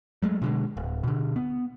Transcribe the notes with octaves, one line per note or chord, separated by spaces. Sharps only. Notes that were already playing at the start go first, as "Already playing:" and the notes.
F#3 G#3 A3
B2 D3 G#3
D1
B2 D3
B3